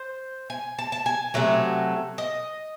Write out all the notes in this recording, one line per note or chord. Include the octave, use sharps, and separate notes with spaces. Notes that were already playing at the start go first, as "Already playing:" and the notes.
Already playing: C5
G#5
A5
A5
G#5
C3 F#3 A3
D#5